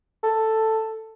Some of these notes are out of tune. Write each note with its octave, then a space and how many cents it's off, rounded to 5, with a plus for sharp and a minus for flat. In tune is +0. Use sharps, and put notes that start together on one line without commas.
A4 +5